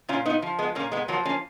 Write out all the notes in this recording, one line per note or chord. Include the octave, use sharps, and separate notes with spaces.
A#2 C#4 F4
B3 D#4
F3
G#3 B3
A#2 A#3 C#4
G#3 B3
F3 F#3 A#3
A#3 C#4